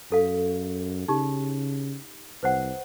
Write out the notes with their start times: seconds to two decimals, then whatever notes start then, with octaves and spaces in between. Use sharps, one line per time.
0.11 F#2 C#4 A4 F5
1.08 C#3 D#4 G4
2.43 C2 B4 C5 F#5